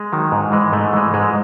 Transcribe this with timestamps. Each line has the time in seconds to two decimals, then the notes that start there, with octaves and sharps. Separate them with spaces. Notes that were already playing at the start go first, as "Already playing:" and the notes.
Already playing: G#3
0.12 D#3 F#3
0.32 G#2
0.52 E3 G#3
0.73 G#2 A3
0.93 E3 G#3
1.14 G#2 G#3